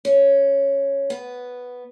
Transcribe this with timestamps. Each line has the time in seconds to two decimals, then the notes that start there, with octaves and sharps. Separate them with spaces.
0.05 C#4
1.10 B3